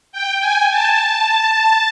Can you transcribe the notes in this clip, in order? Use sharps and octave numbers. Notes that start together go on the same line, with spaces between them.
G5
G#5
A5